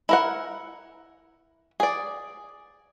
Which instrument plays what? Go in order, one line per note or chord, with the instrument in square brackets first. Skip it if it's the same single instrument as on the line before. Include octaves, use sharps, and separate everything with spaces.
[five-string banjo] E4 A#4 F#5
G#4 D5